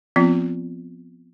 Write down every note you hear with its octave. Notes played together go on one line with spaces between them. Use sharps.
F3 B3 C4 F4